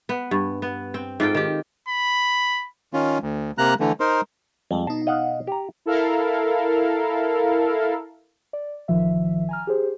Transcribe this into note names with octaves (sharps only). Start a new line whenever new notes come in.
B3
G2
B3
C4
G#2 F4 A4 G5
D#3 G4
B5
D#3 C#4 F4
D2
C3 A#3 A#5 F#6
D3 E3 A3
D#4 A#4 C5
F2 G3 G#3
B2 D#4 A5
D#5 F5 F#5
G4 A#5
E4 A4 A#4 F5
D5
A1 D#3 F3 E5
G#5 A#5 F6
G4 G#4 C5